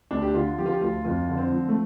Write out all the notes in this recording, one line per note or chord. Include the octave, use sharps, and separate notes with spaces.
D2 D4
G4
D3 F4
F3 G4
F4
G4
D2 F4
F2 F4
D3
C4
F3
A3